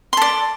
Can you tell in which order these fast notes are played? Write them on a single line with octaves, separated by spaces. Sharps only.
C6 A4 D5